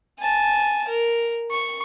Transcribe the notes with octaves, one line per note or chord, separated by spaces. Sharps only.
G#5 A5
A#4
C#6